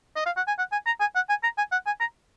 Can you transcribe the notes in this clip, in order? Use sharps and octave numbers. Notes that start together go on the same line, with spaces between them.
D#5
F5
F#5
G#5
F#5
G#5
A#5
G#5
F#5
G#5
A#5
G#5
F#5
G#5
A#5